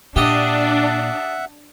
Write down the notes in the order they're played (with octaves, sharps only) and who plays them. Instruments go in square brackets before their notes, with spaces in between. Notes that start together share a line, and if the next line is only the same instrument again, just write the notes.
[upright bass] A#2 [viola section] D4 [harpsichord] G4 D#5 [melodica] E5 F#5